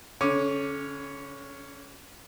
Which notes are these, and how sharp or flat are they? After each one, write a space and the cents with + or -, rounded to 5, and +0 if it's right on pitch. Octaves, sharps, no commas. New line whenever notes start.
D3 -35 C#4 +0 D6 +0